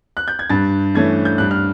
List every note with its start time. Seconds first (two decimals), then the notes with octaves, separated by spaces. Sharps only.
0.17 F#6
0.28 G6
0.39 G#6
0.50 G2 A6
0.95 E3 A3 C#4 G#6
1.25 G6
1.38 G2 F#6
1.51 F6